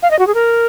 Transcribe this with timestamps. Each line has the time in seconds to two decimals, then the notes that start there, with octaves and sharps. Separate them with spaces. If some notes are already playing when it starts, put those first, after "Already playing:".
0.02 F5
0.11 D#5
0.19 F#4
0.27 G#4
0.34 A#4